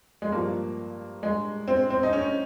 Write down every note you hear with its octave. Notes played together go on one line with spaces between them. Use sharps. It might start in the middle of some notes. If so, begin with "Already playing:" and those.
G#3
G2 F3 A#3
G#3
C4
C4
D#4
C#4